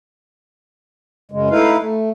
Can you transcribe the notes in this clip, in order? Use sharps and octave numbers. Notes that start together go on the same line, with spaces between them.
F#2 C#3 G#3
A3 D#4 E4 B4 F5
A3